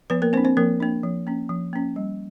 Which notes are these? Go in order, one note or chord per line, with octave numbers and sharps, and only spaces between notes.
F3 B3 B4
A#3 A#4
A#3 C4 D4 C5
C4 C5
F3 A#3 A#4
A#3 D4
F3
A#3 C#4
F3
A#3 C#4
G3